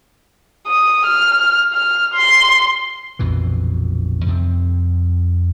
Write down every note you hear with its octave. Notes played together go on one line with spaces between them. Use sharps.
D#6
F6
F6
C6
A#1 F2 B2 E3
F2 C3 F3 C4